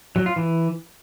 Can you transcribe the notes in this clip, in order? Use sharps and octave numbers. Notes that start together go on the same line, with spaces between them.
F#3
F4
E3